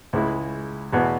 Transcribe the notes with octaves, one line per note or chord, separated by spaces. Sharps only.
C#2 C#3 G#3 E4
E2 B2 B3